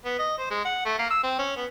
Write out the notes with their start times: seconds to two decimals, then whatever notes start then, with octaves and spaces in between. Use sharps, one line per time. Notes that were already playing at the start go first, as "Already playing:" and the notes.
0.05 B3
0.19 D#5
0.38 C5
0.50 G#3
0.65 F#5
0.86 A3
0.99 A#3
1.10 E6
1.23 C4
1.39 C#4
1.56 B3